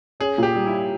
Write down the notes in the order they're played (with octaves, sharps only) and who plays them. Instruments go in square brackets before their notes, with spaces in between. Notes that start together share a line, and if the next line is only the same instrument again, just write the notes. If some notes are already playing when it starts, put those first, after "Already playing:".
[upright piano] C#4 [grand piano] G#4
[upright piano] A#2 [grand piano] G4
[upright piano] G3
[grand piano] E4